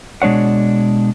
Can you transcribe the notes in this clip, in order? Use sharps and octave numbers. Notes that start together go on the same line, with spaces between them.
B2 G#3 D4 C#5 F#5